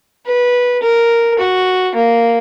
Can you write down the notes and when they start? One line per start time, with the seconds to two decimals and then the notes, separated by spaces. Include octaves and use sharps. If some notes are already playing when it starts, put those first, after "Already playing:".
0.26 B4
0.83 A#4
1.39 F#4
1.95 A#3